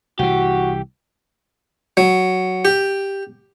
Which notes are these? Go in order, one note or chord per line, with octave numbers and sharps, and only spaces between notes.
C2 E3 F#4 G4
F#3
G4